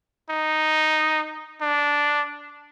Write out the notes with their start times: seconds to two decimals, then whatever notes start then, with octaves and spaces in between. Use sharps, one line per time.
0.30 D#4
1.61 D4